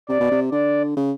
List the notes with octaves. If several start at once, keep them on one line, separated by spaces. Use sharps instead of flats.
C3 D5
B2
C3
D3 D5
C#3